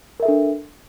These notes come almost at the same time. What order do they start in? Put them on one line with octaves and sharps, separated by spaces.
A#4 E5 A4 D4